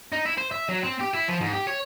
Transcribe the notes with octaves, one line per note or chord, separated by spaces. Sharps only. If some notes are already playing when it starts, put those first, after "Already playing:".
D#4
E4
C5
E5
F#3
C4
G4
E4
F3
G#2
G4
C#5